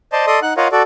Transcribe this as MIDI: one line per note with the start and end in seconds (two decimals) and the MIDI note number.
0.13 0.26 72
0.13 0.26 74
0.13 0.26 75
0.13 0.26 81
0.13 0.26 84
0.27 0.40 69
0.27 0.40 74
0.27 0.40 75
0.27 0.40 84
0.27 0.40 87
0.42 0.53 63
0.42 0.53 78
0.42 0.53 90
0.57 0.68 65
0.57 0.68 70
0.57 0.68 73
0.57 0.68 75
0.57 0.68 77
0.57 0.68 78
0.72 0.83 66
0.72 0.83 69
0.72 0.83 74